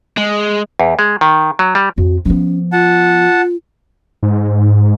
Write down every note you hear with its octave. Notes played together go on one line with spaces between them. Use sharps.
G#3
E2
G#3
D#3
F#3
G3
F2 F#4
F3 B3 C#4
F4 F#5 A5
G#2